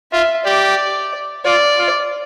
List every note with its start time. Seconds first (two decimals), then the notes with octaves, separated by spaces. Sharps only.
0.12 F4 E5
0.45 G4 D5
1.45 F4 D5
1.78 F4